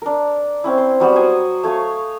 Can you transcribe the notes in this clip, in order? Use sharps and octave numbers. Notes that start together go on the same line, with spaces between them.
D4 A#4
C4 C#4 E4
C6
F#3 G3 B3 F#4
C5 F#5 G#5 D#6
A3 C#5 F5 G#5